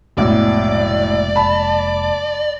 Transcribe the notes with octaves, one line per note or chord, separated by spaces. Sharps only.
F1 B1 A2 G#3 A#3 D5
A5 B5